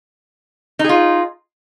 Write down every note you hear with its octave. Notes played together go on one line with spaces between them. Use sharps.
D#4 F4 G#4